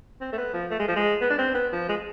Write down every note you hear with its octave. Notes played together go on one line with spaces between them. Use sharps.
C4
A3
B3
F3
A3
G#3
F3
G#3
B3
D4
C4
B3
F3
G#3